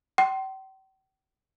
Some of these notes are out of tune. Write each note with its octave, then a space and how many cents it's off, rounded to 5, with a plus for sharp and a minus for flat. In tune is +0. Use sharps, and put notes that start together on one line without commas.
G5 -45 C6 +0